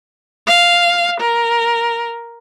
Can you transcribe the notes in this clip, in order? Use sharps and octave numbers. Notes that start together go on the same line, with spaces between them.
F5
A#4